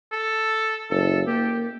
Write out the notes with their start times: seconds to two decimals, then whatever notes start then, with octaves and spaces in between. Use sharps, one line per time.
0.12 A4
0.90 F#1 A4
1.27 A#3 G4